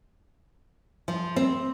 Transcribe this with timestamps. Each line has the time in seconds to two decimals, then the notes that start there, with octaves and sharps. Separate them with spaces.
1.08 F3
1.36 C4